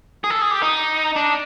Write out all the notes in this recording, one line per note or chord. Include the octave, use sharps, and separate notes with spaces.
G#4
A4
G#4
G4
D#4
D4